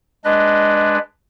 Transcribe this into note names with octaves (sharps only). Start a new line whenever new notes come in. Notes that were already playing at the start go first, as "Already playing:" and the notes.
G#3 D4 B4 D#5